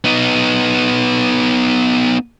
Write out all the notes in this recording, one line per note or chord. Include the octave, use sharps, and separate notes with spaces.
B3 D#4